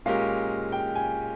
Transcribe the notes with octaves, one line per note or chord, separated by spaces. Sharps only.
A#2 G#3 C#4 G4 A#4 F5
G5
G#5